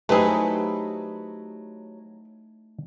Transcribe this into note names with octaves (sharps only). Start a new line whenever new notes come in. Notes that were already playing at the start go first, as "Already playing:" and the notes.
F#3 A3 D#4 E4 G4 G#4 B4 C5